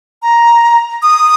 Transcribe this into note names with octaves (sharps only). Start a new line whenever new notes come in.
A#5
D#6